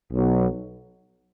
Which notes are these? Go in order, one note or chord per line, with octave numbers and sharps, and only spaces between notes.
B1 B2 F#3